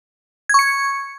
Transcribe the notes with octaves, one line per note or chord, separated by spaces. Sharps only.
C#6 G#6 C#7